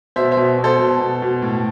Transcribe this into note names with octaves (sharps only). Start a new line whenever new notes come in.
B2 C5 E5
C5 E5
B2
B2
A4 C5
B2
B2
B2
A2